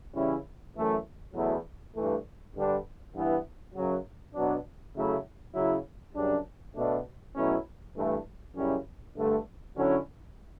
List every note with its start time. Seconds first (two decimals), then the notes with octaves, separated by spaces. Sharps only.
0.13 C#3 E3 G3 C#4 E4
0.74 F#2 E3 A3
1.34 E2 B2 F#3 A3 E4
1.94 G2 E3 A3
2.54 G2 D3 G3 D4
3.14 G2 E3 B3 E4
3.74 F#2 C#3 F#3
4.34 B2 F#3 B3 D4
4.94 C#3 F#3 A3 E4
5.54 C#3 F#3 C#4 E4
6.14 F#2 C#3 G3 D4
6.75 B2 A3 D4
7.34 B2 F#3 A3 C#4 E4
7.95 G2 E3 A3
8.54 F#2 C#3 G3 C#4 E4
9.15 G2 D3 A3
9.75 D3 F#3 C#4 E4